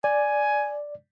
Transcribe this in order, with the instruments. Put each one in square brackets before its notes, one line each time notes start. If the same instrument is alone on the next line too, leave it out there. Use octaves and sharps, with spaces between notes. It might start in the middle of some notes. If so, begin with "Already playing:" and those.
[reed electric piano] D5 [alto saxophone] G#5